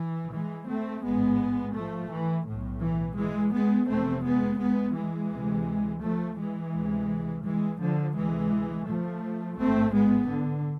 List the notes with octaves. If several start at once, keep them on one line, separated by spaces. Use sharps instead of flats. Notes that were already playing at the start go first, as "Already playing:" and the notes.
Already playing: E3
E3 G#3
A3 C4
A1 G#2 G#3 B3
F3 A3
E3
B1 A2
E3
E3 G#3
G#3 B3
F1 E2 C3 A3 C4
G#3 B3
G#3 B3
E3 G#3
D2 C3
F3 A3
E3 G#3
D2 C3
E3 G#3
D3 F3
D2 C3 E3 G#3
F3 A3
A1 G#2 A3 C4
G#3 B3
D3